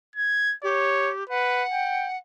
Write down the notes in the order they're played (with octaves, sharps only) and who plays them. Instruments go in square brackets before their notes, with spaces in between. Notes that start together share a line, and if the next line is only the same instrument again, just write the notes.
[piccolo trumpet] G#6
[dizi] G4 [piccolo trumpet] C#5
[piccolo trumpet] B4 [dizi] F#5
[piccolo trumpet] G5